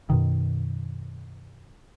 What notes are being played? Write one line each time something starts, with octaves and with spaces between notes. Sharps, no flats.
F#2 B2 D#3